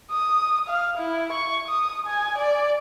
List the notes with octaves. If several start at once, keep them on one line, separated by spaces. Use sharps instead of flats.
D#6
F5
E4
C#6
D#6
G#5
D5